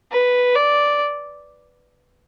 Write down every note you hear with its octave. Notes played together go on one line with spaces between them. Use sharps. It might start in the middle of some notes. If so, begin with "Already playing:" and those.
B4
D5